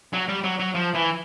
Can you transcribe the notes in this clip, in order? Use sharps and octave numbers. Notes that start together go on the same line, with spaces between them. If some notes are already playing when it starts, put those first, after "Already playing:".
F#3
G3
F#3
F#3
F3
E3